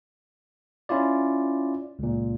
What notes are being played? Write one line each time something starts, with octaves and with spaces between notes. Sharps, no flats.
C#4 E4 F4 D5
C#2 A#2